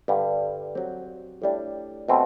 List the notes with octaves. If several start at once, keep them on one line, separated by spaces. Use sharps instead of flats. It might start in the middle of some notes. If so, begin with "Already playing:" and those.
G2 D3 G3
F#3 C4 G4
A2 G3 D4
B2 A3 C4